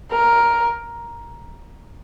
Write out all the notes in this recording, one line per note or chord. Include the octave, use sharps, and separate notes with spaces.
A#4